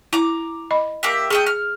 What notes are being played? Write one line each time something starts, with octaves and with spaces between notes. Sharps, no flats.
E4 A#5 D6
D#5 B5
A#3 G4 E5
A3 G#4 D#5 G5
F6